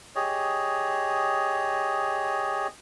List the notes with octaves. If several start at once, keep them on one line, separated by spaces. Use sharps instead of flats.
G4 G#4 C#5 D#5